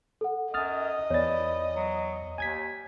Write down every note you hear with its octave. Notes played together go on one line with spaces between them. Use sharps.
A4 F#5
F#2 D#5 D#6 F6 A6
E2 E3 C#5 D5 A6
F#3
D#2 G#5 G#6 B6